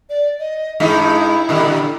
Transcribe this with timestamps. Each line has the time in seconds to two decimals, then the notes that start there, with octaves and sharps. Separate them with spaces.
0.10 D5
0.39 D#5
0.80 G2 G#3 D#4 E4
1.49 A#2 D3 G3